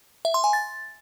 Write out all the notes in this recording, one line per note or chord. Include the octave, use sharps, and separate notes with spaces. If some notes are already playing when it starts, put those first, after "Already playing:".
E5
C6
G#5
A6